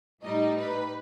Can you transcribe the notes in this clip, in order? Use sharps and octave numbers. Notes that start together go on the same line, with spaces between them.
A2 G3 D#4 D#5
B4